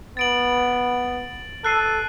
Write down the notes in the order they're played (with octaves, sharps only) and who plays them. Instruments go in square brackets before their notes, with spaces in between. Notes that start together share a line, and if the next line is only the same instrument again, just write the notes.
[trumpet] B3 [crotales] A6 D7 F#7
[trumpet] A4 [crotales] F#6 C7 D#7